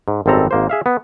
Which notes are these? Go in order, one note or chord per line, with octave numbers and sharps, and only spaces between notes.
G#2
G#1 F#2 G3 C4 A4 A#5
G#1 A#3 C5
G#4 E5 F5
B3